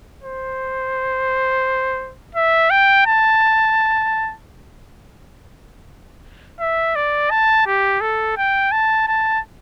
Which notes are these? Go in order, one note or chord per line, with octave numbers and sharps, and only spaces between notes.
C5
E5
G5
A5
E5
D5
A5
G4
A4
G5
A5
A5